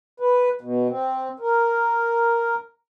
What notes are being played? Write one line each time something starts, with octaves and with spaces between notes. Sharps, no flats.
B4
B2
C4
A#4